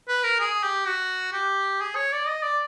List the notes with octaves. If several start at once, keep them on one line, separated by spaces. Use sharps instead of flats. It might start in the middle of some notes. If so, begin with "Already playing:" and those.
B4
A#4
G#4
G4
F#4
G4
G#4
C#5
D5
D#5
D5